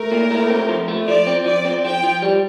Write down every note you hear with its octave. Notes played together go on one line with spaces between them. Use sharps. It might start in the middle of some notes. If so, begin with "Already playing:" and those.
Already playing: A3 A#4
A#2
A3
C4
F3
A3
F3 D5
C4
F3 D5
C4
F3 G5
F3
G3